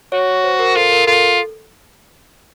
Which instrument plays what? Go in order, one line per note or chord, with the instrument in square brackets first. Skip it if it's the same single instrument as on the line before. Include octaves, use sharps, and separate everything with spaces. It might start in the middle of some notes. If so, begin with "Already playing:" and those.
[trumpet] F#4 [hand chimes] C#5
[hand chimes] C5
A#4
[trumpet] F4 [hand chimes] A4
[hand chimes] A#4
[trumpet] F4 [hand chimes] A4